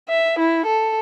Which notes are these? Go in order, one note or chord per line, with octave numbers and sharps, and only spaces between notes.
E5
E4
A4